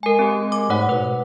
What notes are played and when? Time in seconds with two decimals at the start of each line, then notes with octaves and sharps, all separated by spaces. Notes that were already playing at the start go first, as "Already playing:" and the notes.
0.03 G#3 A#4 G#5
0.19 C4 G4
0.52 D6
0.70 G#2 A3 C#5 F#5
0.89 B2 B4